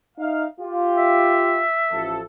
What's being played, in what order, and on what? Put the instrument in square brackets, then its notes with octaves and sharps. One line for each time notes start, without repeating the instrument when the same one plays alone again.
[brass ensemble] D#4 E5 F5
F4 G4
[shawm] E5
[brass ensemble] A1 F3 A4